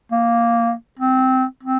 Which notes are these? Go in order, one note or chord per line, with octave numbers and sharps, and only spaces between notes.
A#3
C4
C4